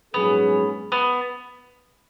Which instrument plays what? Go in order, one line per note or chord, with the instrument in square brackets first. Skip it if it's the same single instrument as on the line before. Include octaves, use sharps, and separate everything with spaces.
[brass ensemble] A#1 G#2 F#3 C#4 G#4 [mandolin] B3
[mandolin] B3